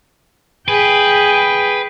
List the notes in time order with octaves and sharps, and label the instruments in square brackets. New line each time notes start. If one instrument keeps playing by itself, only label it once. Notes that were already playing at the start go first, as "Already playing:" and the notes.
[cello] G#4 G5 [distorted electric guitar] B4